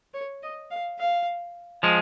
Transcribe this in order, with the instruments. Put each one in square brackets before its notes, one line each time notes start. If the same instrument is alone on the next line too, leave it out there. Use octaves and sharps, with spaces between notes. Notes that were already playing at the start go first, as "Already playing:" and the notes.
[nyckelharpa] C#5
D#5
F5
F5
[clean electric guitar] F3 G#3